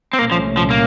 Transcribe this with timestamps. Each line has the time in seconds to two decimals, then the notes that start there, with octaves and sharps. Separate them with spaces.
0.13 C4
0.18 C2 A#2 A3 A#3 C#4
0.31 F3
0.57 F3
0.70 A#3